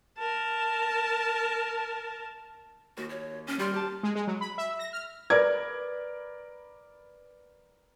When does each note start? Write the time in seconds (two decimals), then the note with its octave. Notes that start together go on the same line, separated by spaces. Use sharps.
0.19 A#4 A5
2.97 D#2 F#4
3.09 C#5
3.47 C#4
3.59 G3 G4 C6 F6
3.74 G4 A5
4.03 G#3
4.15 G#3
4.27 F#3
4.41 B5
4.58 E5
4.79 A#6
4.93 F6
5.30 A#4 B4 D5 G#6